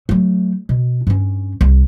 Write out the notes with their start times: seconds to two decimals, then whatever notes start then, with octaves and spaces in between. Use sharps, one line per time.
0.09 F#3 A3
0.69 B2
1.07 G2 C#4
1.61 C2